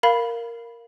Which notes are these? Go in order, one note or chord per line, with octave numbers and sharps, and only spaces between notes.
A#4 F5 B5